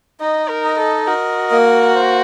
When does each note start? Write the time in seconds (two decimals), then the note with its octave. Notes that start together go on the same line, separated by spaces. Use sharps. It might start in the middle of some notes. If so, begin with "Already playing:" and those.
0.20 D#4 D#5
0.49 A#4
0.64 D#5
0.79 A4
1.07 F#4 A#4
1.51 A#3
1.95 C5